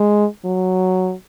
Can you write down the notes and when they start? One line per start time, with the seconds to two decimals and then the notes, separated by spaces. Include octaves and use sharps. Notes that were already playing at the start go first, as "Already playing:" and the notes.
Already playing: G#3
0.45 F#3